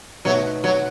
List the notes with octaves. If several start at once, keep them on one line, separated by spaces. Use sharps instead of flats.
B2 F#3 A3 D#4 F#4
F#3